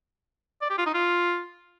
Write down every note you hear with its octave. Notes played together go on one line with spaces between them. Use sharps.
D5
G4
F4
D#4
F4